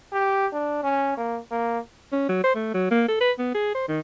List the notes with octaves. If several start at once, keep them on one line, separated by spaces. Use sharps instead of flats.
G4
D4
C#4
A#3
A#3
C#4
F#3
C5
A3
F#3
A#3
A4
B4
B3
G#4
C5
D#3